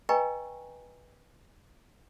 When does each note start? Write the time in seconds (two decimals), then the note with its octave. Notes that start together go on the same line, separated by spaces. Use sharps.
0.09 B4 D#5 G5 G#5 A#5 C#6